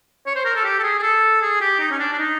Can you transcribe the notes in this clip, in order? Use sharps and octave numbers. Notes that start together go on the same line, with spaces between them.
C#5
C5
A#4
A4
G4
A4
G#4
G#4
A4
G#4
G4
D#4
C#4
D4
D4
D#4